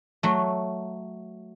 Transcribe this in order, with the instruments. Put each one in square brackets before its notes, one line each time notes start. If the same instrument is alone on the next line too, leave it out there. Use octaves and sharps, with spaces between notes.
[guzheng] F#3 A3